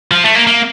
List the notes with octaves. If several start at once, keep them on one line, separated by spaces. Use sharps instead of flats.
F3
A3
A#3
A#3